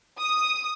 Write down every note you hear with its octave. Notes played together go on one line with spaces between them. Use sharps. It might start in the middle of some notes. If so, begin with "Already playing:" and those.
D#6